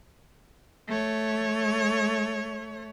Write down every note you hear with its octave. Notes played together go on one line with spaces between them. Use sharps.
A3 C#5